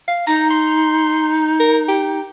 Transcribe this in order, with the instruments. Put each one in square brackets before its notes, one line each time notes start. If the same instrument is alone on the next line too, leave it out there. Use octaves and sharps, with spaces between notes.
[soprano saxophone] F5
[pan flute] D#4 [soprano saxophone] A#5
[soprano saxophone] C6
A#4
G4